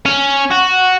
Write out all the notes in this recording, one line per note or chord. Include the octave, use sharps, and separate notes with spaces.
C#4
F#4